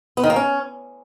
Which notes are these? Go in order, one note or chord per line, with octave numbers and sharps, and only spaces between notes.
B3
D#3
A#3
C#4